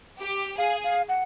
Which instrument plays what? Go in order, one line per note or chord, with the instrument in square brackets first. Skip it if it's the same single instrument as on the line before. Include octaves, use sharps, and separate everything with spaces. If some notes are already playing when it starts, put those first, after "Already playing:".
[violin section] G4
[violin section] G#4 [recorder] F5
[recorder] F5
F#5